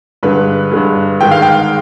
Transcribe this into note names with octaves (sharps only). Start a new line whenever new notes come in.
G2 D3 G#3 B4
G2 D3 G#3
G#2 D#3 G#3 G5
F5
G5